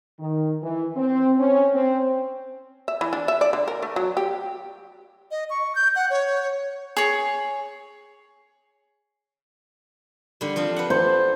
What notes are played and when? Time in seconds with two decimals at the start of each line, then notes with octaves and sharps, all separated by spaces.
0.20 D#3
0.62 E3
0.96 C4
1.39 C#4
1.74 C4
2.88 E5
3.01 E3
3.13 D4
3.28 E5
3.41 D5
3.53 D3
3.68 A#4
3.82 A3
3.96 F#3
4.17 G4
5.31 D#5
5.50 C#6
5.75 G6
5.96 F#5
6.10 C#5
6.97 G#4 C#5
10.41 D3 G3
10.56 F3 C4 D4
10.76 B4 F#5
10.90 A4 C5